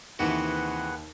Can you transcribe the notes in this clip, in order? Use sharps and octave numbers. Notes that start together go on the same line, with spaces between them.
D#2 C3 E3 F#4 G#4 B4 F#5